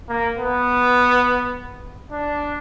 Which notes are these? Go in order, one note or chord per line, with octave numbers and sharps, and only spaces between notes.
A#3
B3
D4